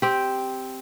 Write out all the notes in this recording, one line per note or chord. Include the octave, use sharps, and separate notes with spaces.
C4 G4